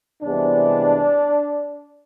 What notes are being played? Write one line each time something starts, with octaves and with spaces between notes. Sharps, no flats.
C2 C3 E3 G#3 B3 D4